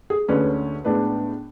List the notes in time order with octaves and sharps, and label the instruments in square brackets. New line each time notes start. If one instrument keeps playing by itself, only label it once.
[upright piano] G#4
D2 D3 G#3 C#4 B4
A2 G#3 B3 D4 B4